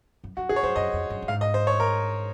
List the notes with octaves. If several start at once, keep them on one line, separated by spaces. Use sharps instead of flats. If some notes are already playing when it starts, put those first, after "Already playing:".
F#2
F#2 F#4
F2 G#4
C#5
F#2 C5
F#2 D#5
F2
F#2
F#2
G#2 F5
D#5
C5
C#5
A#4